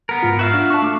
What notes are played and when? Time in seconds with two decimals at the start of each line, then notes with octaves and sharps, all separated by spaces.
0.09 B3 A#4
0.23 G#2 F4
0.39 F#4 E5 F5
0.54 D4
0.70 A5 C#6
0.82 A3 D6